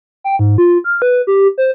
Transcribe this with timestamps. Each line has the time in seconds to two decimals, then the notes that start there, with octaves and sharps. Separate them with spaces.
0.24 G5
0.39 G#2
0.58 F4
0.84 F6
1.02 B4
1.27 G4
1.58 C5